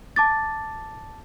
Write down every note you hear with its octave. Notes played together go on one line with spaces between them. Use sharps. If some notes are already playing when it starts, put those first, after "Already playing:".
A5 D6 A6